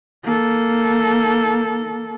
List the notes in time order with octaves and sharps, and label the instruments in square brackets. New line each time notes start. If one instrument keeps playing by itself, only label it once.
[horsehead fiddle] A#3 A4